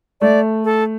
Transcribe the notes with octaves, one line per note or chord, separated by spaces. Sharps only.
A3 D5
A4